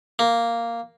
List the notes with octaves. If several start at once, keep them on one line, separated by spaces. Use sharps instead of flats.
A#3